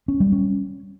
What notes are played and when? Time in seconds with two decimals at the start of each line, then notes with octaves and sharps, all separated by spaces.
0.08 C#4
0.20 G3
0.32 C#4